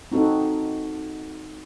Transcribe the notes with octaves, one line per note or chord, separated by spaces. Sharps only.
C4 D#4 F#4 A4